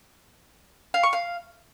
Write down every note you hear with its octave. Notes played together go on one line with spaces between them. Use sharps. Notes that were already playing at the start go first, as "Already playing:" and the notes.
F5
C#6
F5